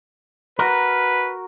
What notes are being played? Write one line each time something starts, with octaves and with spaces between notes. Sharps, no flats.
F#4 A#4 B4